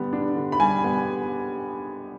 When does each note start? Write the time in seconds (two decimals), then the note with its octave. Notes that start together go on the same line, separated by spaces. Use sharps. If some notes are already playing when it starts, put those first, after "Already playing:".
Already playing: D3 G3 B3
0.13 D4
0.35 D3
0.52 B5
0.60 G3 G#5
0.84 B3